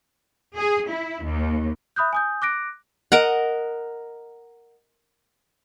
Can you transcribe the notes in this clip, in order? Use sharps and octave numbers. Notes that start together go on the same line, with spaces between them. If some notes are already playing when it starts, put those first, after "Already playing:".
G#4
E4
D#2
E5 B5 D#6 F#6 G6
G#5 D#6 G6
D6 F#6 A#6 D7
A#4 D#5 F#5